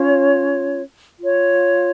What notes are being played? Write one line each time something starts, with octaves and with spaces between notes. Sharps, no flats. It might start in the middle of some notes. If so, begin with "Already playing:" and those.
Already playing: C#4 F4 C#5
F4 C#5